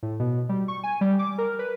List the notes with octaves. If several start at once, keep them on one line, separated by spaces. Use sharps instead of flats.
A2
B2
G3
C#6
G#5
G3
D6
A#4
B4